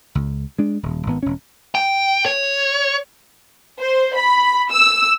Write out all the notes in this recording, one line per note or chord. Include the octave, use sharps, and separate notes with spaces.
C#2
G#3 D4
D#1
G#1 B3
E1 C#4
G5
C#5
C5
B5
E6